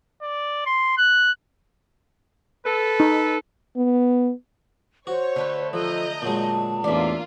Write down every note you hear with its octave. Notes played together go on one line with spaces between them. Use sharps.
D5
C6
F#6
A4 B4
D#4
B3
F#4 C5 C#5
D3 A3 B4
F3 A4 D#5 A#5 G6
A#2 F#3 G#3 A5
A1 E2 A#3 D4 F4 D5 E5